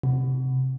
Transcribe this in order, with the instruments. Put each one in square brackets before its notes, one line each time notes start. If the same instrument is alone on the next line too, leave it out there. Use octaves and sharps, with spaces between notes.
[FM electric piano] C3